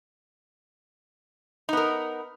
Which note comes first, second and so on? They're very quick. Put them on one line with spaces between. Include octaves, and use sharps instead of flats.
D#4 B3 A#4